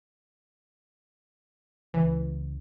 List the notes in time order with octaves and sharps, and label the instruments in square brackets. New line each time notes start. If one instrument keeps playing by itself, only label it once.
[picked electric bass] C#2 [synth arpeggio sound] E3